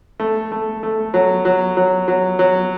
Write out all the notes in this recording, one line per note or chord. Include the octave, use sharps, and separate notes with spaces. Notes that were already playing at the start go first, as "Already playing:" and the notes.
A3
A3
A3
F#3
F#3
F#3
F#3
F#3